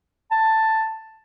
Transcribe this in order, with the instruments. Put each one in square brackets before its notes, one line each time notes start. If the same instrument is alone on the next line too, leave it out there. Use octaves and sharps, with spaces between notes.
[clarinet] A5